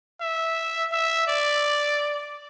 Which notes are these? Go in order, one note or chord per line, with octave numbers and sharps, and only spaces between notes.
E5
E5
D5